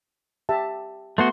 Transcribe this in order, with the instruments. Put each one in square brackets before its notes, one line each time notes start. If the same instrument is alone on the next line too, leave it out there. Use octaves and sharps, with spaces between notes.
[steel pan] G4 E5 A5
[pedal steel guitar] A3 B3 F#4 [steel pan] C6